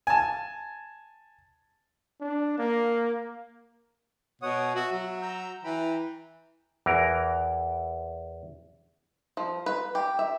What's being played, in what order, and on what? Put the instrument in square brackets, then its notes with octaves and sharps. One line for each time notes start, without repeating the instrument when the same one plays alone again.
[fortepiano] G#5 A5
[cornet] D4
A#3
[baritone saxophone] B2 [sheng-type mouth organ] C#5 F#5 D#6
[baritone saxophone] F#4 [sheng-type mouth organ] E5
[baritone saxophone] F#3
[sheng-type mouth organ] A#5 E6 G6
[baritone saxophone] E3 [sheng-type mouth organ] G5 A#5 B5
[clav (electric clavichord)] E2 E3 A#4
[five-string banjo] F3
B4
G4
E5